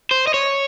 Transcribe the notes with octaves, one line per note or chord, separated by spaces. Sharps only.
C5
D#5
C#5